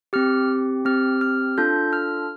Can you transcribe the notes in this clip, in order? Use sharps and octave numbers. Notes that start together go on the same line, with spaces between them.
C4 G4 F6
C4 G4 F6
F6
D4 F4 A4 G6
F6